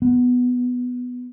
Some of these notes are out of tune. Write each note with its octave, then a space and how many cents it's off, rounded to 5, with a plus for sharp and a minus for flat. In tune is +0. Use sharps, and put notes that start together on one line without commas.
B3 +5